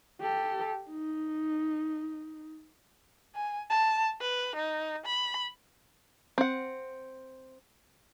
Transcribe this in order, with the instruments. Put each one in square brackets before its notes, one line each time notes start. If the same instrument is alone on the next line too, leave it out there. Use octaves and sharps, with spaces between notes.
[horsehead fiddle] G4 A4
D#4
[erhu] G#5
A5
B4
D#4
B5
[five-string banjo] C4 F#5